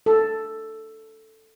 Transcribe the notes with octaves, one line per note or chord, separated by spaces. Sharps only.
A4